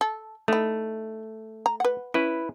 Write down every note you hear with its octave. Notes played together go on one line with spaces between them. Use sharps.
A4
A3 D#4 E4
A#5
B4 F#5
C#4 E4 B4